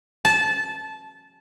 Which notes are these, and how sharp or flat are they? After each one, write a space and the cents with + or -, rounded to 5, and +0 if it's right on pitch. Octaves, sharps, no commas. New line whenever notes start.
A5 -20